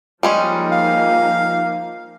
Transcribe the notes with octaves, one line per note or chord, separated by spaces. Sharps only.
F3 G3 G#3 A#3 C#4 D#4
F5